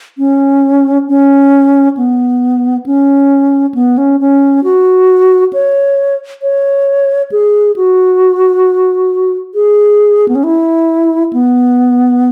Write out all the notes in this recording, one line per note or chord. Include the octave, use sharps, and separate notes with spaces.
C#4
C#4
B3
C#4
B3
C#4
C#4
F#4
C#5
C#5
G#4
F#4
G#4
B3
C#4
E4
B3